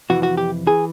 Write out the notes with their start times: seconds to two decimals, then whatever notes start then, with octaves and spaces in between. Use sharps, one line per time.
0.10 F2 C3 E3 F#4
0.23 F#4
0.37 G4
0.67 E3 G#4